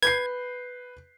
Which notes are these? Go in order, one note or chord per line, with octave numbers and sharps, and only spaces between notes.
B4 G6 G#6 C7